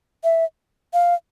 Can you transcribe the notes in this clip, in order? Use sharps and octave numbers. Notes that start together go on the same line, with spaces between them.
E5
F5